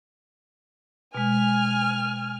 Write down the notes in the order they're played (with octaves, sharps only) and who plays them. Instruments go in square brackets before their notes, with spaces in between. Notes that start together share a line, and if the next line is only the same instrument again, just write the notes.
[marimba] B2 G#3 [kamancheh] G#5 F6